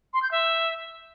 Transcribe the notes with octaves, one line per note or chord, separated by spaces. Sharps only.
C6
G6
E5